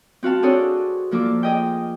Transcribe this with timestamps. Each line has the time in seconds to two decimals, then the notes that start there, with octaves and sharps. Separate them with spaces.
0.23 C4 F#4 F5 A5
0.42 C4 D4 G#4 A4 C5 C#5
1.11 F3 A#3 D4 A4 D6
1.43 G#4 D#5 G5